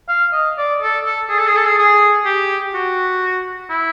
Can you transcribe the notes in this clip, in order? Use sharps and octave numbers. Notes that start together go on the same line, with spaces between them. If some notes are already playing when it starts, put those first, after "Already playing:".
F5
D#5
D5
A4
A4
G#4
A4
G#4
A4
G#4
G#4
G4
F#4
E4